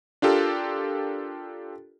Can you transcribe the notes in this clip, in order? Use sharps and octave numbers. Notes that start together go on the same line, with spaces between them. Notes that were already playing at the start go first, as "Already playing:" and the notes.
D4 F4 G4 A4 A#4